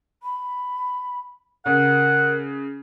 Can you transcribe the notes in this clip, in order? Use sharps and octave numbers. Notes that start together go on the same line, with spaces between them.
B5
C#3 A#4 F#5